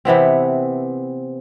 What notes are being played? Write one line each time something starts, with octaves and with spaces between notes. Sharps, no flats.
C3 E3 B3 C4